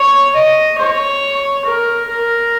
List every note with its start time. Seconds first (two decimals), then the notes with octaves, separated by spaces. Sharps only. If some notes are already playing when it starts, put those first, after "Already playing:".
Already playing: C#5
0.35 D#5
0.78 C#5
1.65 A#4
2.08 A#4